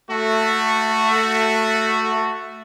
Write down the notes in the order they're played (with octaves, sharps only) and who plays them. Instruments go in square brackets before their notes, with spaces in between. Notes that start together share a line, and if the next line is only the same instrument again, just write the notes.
[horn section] A3 F#4